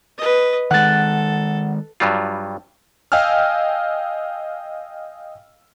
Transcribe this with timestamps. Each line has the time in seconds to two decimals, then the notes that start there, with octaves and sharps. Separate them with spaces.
0.18 B4 D#5
0.71 D#3 G#3 A4 F#5 F#6 A6
2.00 G2 F#3 G3 F4
3.12 D#5 F5 G5 G#5 E6 F6